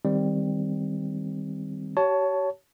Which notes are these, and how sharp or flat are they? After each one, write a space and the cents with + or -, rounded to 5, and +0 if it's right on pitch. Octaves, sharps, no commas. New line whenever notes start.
D#3 +0 G3 +10 C4 +0
G4 -40 C#5 +15 A5 +0